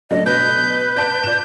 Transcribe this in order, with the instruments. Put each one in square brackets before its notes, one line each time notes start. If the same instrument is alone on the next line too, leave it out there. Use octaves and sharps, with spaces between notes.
[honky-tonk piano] F#3 A3 D4 [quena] D#5
[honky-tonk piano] B2 [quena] B4 [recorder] G6
[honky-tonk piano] D5 A5 D7 [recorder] G6
[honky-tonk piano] D5 E7